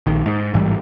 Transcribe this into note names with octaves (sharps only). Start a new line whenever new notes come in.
A#1 D#3
G#2
A1 G#2 E3 G3